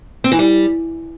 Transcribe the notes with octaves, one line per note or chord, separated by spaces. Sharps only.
C4
E3
G3